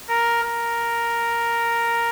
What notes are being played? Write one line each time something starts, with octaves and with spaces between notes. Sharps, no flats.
A#4
A#4